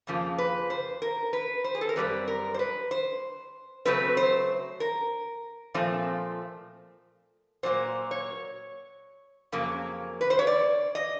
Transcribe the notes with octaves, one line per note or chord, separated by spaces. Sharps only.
F2 C#3 F3 A#3
B4
C5
A#4
B4
C5
G#4
A4
A#4
F#2 D#3 G3 C4 B4
A#4
C5
B4
C5
C#3 F#3 A3 C4 B4
C5
A#4
A#2 F3 A3 C4
A#2 F#3 A#3 C5
C#5
F2 C#3 F#3 A#3
B4
C5
C#5
D5
D#5